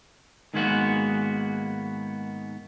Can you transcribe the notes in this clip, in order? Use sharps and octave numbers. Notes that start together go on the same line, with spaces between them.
G#2 D#3 G#3 A#3 B3 F#4